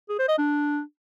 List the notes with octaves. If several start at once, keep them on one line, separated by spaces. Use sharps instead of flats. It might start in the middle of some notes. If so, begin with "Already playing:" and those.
G#4
C5
D#5
D4